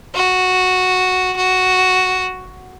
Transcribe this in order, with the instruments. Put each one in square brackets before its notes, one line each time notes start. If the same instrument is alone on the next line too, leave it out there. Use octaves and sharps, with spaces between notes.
[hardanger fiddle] F#4
F#4